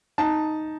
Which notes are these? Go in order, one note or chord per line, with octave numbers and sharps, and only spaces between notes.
D#4 A5